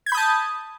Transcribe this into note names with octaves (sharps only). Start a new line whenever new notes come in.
A5 B5 D#6 G6 G#6